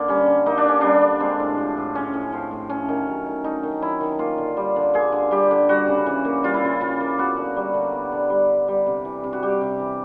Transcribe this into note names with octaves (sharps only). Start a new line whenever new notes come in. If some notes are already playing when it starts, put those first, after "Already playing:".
Already playing: D3 A#3
G3 C#4
D3
A#3 D#4
D4
D3 C#4
G3 D4
D3
G#3 C4
A2
F3
A2
G#3 C#4
A2
F3 C4
A2
A3 C#4
D#3
F#3
D#3
A3 D#4
D#3
F#3 E4
D#3
A#3 F4
D3
G3
D3
A#3 G#4
D3
G3 G4
D3
G3 F#4
C#3
E3
A#3
G3 F4
E4
C#3 F4
E3 F4
A#3
B3 F#4
D3
G3
D3
B3
D3
G3
D3
G3
C3
E3
C3
F#4
G3 G4
C3
E3